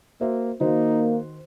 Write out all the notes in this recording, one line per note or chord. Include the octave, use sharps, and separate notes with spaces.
A#3 F#4 C5 E5
D#3 A#3 D#4 F#4 C5